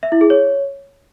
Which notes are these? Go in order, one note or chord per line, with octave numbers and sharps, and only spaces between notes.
E5
E4
G#4
C#5